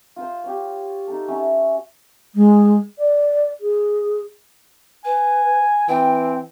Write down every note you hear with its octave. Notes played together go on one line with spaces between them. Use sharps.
F4 C5
G4 C#5
D#4 A4
F#3 C#4 C#5 E5
G#3
D5
G#4
B4 G#5
E3 C4 G5